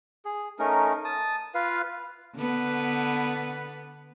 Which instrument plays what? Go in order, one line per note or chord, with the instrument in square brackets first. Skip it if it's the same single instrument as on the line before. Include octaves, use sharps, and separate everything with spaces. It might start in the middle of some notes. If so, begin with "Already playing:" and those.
[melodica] G#4
A3 C#4 D#4 A#4
A5 D#6
F4 B4 F5
[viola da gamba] D3 B3 B4